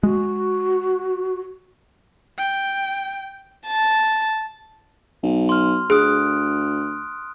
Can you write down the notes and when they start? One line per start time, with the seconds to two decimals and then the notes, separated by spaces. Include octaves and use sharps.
0.03 G#3 F#4
2.39 G5
3.67 A5
5.23 B1
5.49 C6 F6
5.90 D2 G#4 D#6 F#6 D7